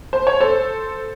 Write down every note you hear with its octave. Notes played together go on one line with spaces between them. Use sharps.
C5
C#5
A4 C5